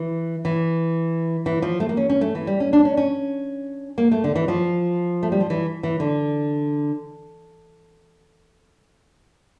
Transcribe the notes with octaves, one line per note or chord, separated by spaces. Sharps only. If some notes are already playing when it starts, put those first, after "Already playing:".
Already playing: E3
E3
E3
F3
A3
A#3
C#4
C#4
A3
E3
G3
C#4
D4
C#4
C#4
A#3
A3
D3
E3
F3
A3
G3
F3
E3
E3
D3